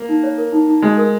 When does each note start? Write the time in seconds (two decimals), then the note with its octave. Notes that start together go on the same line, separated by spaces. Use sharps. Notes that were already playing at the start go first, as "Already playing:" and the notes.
Already playing: A#3
0.09 D#4
0.23 C#5
0.38 A#4
0.52 D#4
0.67 D#4
0.82 G#3 F#4
0.98 A#4